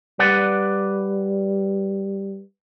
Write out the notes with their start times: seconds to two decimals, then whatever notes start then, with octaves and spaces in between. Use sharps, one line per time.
0.19 G3 B4 D5 F#5